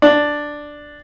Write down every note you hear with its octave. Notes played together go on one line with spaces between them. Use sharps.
D4